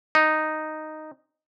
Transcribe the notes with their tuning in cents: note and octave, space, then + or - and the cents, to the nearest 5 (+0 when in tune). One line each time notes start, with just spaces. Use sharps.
D#4 -5